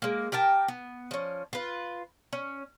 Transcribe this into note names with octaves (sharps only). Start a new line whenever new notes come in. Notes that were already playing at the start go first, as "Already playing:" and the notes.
G#3 A#3
G4 A#4 G5 A5
B3
F3 C#4
F4 B4
C#4